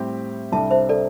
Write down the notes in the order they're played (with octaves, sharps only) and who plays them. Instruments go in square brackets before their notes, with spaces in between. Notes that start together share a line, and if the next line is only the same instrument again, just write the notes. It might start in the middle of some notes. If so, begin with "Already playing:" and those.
Already playing: [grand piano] A2 G3 C4 G4
[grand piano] C2 C3 G3 D4 A4 [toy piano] E5 A5
[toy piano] C5 E5
A4 D5